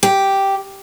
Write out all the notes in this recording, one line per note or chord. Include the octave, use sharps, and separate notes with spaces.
G4